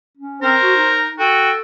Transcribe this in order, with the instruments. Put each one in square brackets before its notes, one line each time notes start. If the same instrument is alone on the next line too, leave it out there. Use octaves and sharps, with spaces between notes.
[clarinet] C#4
[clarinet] C4 [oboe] A#4 [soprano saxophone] C5
[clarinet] F#4
D#4
[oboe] F#4 [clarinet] A4 [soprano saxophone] G5